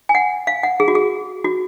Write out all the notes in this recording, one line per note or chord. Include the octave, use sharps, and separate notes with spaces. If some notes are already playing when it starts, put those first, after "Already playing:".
G#5
F#5
F5
F#5
G#4
F#4
G#4
F#4